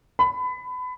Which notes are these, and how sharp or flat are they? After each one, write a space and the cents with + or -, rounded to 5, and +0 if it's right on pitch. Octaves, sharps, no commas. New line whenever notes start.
B5 +25